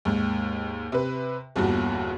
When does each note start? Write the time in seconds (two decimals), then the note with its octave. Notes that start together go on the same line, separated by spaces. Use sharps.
0.05 D#2 G#2
0.92 C3 B4
1.56 G1 E2 G2 A#2 F#4